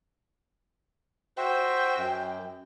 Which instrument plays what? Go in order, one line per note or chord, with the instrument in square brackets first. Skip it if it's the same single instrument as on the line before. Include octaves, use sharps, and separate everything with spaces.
[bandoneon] F#4 C5 E5 [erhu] G5
[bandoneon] F#2